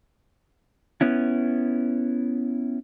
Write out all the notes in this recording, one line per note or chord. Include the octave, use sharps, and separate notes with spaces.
B3 C#4 E4